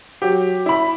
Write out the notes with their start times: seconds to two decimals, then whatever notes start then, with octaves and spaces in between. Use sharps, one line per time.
0.22 F#3 G4
0.66 E4 B5